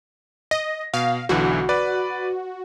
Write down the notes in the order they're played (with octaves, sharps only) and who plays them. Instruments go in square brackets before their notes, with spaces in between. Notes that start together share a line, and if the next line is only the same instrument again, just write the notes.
[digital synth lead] D#5 [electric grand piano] A#6
[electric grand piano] B2 [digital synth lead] F5
[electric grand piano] B1 D3 E3 [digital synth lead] F#4
[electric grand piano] B4 D5